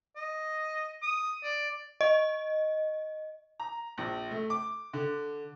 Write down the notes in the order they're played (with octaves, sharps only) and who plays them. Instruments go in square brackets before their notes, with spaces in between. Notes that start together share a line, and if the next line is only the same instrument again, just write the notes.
[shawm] D#5
D#6
D5
[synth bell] D#5
[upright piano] A#5
A#1
A3
D6
D3